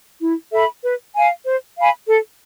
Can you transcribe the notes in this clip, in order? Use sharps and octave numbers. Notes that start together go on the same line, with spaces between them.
E4
A4 E5 B5
B4
F5 G#5
C5
F5 G#5 B5
A4